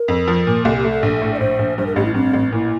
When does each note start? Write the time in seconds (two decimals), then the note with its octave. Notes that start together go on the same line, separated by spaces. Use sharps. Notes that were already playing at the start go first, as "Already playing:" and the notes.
Already playing: A#4
0.08 F2
0.28 F3
0.47 A#2
0.65 C2 A4
0.77 G4
0.84 A3
0.90 A4
1.03 A#1
1.22 A2
1.34 D5
1.40 A#1 C5
1.59 A#1
1.78 G2 C5
1.86 A#4
1.96 A1 G4
2.05 E4
2.15 G2 C4
2.33 A1
2.52 A#2 E4